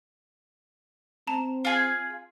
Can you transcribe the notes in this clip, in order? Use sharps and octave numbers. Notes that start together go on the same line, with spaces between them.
C4 A5 A#5
F4 G#4